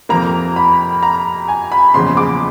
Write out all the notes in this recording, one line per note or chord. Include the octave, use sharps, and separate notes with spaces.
F2 C3 F3 A#3 A#5
B5
A#5
G#5
B5
F#1 E2 C#3 F3 C6
D6